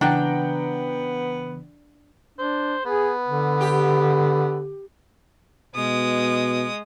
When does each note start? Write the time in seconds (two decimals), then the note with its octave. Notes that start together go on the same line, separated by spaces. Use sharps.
0.01 C#3 E3 B3 D4 F#5 G5 A#5
2.39 D4 C5
2.85 B3 G#4
3.28 D3
3.60 G4
5.75 B2 G#3 D#6